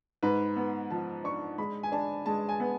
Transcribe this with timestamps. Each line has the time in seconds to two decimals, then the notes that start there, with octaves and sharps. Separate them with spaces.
0.23 G#2 B4
0.56 B3
0.90 F3 A5
1.24 D4 C#6
1.58 G#3 B5
1.83 G#5
1.92 D4 A5
2.26 G#3 A5
2.49 G#5
2.60 B3